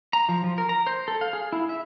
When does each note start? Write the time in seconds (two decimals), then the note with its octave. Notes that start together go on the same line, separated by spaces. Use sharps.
0.13 A#5
0.29 F3
0.44 F3
0.58 A#4
0.69 A#5
0.87 C5
1.08 A4
1.21 F5
1.33 G#4
1.53 E4
1.69 E5